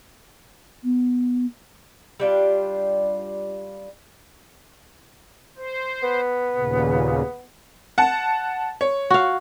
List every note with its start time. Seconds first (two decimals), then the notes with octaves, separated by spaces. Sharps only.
0.84 B3
2.20 G3 D4 F4 G4
5.57 C5
6.03 B3
6.55 D#2 A#2 C#3
7.98 F#5 A5
8.81 C#5
9.10 F#4 F5